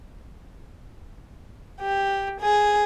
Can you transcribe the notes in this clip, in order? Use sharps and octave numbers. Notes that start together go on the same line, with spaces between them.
G4
G#4